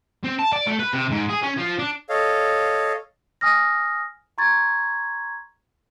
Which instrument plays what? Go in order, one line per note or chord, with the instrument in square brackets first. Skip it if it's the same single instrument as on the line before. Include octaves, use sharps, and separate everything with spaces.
[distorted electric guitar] C4
A5
D5
A3
B4
C3
G#2
G#4
C#4
F3
D4
[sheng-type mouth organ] A4 C#5 D#5 F5
[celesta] G#5 D#6 F6 A#6
A#5 C6 C#6 G#6 A6